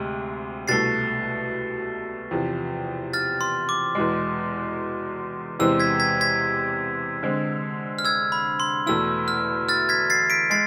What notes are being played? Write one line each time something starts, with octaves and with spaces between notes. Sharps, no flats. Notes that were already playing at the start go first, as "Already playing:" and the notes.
Already playing: D2 C3 G#3
C2 B2 A3 A6 C7
E2 C3 F3
F6 A6
C6
D6
E2 B2 G#3
E2 C3 E3 G#3 C4 E6
G#6 B6
G#6 B6
G#6 B6
D3 G#3 C4
F6
E6 G#6
B5
C6
E2 B2 A3 E4 E6
F6
F6 A6
G#6 B6
A6 C7
B6 D7
G#3 A6 C7